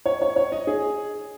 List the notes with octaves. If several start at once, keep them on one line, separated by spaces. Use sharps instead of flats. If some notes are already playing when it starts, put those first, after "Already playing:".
C#5
C#5
C#5
D#5
G#4